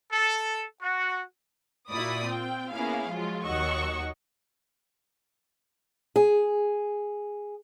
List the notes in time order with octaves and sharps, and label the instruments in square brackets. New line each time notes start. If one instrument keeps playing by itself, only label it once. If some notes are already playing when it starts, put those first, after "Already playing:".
[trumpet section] A4
F#4
[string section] A#2 E4 F#4 D5 B5 D#6
C4 F4 G5
A#3 B3 C#4 E4 G#4 F5
F3 F#3 G#3 F4
D#2 F#3 D#5 F#5 C#6 E6
[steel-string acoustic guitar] G#4